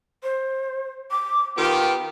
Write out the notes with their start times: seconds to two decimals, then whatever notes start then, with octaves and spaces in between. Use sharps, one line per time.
0.23 C5
1.11 D6
1.57 D#3 B3 F4 G4